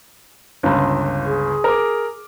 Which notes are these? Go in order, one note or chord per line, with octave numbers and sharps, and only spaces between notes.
G1 C#2
G#4
A#4 D6